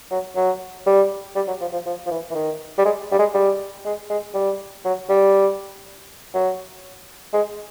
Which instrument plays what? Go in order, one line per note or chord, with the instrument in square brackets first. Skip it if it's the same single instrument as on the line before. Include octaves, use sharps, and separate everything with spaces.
[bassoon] F#3
F#3
G3
G3
F#3
F3
F3
F3
F3
E3
E3
D#3
G3
G#3
G3
G#3
G3
G#3
G#3
G3
F#3
G3
F#3
G#3